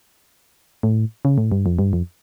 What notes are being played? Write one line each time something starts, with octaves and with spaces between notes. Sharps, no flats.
A2
C#3
A2
G2
F2
G2
F2